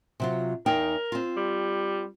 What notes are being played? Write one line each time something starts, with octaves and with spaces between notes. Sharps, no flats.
C3 F#3 F4
E2 D#4 A#4 G5
C4 F4
G3